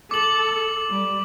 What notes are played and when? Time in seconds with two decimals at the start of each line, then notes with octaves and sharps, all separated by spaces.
0.11 A4 D6 F#7
0.91 G3